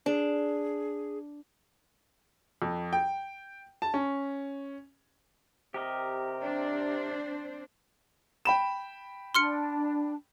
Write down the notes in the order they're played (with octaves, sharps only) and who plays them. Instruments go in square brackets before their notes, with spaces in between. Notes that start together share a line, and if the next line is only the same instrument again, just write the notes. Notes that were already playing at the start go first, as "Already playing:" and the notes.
[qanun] D4 [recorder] G#4
[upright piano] F2
G5
A5
C#4
[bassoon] C3 [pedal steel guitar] G4 A#4 D#5
[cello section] C4 D4 C5
[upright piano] G5 B5 E7
[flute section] D4 [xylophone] C6 F6 C#7